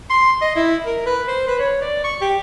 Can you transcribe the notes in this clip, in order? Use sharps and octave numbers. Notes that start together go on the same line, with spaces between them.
C6
D#5
E4
A#4
B4
C5
B4
C#5
D5
C#6
G4